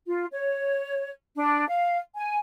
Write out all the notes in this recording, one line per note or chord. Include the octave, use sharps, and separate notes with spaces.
F4
C#5
D4
F5
G#5